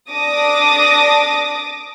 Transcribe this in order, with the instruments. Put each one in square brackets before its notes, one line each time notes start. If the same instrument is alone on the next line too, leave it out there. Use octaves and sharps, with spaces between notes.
[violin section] D4 D6 D#6 A#6